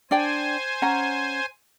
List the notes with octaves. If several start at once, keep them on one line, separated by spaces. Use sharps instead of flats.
D4 C5 D5 G5 G#5
C#4 F#5 A#5